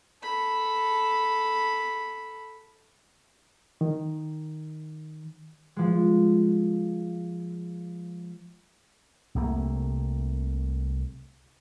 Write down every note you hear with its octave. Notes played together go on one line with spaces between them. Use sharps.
A4 B5
D#3
F3 G#3
C2 C3 A3 A#3